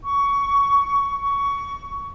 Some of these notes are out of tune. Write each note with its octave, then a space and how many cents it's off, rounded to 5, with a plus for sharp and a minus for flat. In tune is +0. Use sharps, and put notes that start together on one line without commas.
C#6 +15
C#6 +20